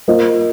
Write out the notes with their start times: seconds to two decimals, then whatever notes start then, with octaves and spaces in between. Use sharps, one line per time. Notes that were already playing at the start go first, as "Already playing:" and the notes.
0.08 A#3 F4 C5 D#5